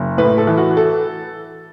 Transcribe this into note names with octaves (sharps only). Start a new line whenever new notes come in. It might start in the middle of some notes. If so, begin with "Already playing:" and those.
Already playing: F#1
A2 B4
A4
E3
F#4
A4